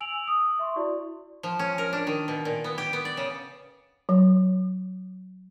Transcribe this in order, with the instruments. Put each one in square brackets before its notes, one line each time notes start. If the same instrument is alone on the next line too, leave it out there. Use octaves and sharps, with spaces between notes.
[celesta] G#5 E6 D7 F7 F#7
D#6
E5 C6 C#6
E4 F#4 D5
[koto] F3
C#4
A#4
D4
D#3
B2
A#2
B3
G4
B3
D5
C#3
[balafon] F#3